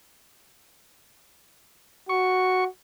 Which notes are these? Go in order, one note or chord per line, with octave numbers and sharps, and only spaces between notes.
F#4 C#6